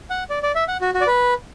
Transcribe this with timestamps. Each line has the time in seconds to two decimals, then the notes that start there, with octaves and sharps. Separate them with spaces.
0.10 F#5
0.30 D5
0.43 D5
0.55 E5
0.68 F#5
0.81 F#4
0.94 F#4
1.01 D5
1.07 B4